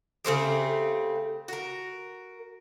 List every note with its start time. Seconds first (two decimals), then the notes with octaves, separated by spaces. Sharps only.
0.25 C#3 A3 C4 G4
1.48 F#4 A#4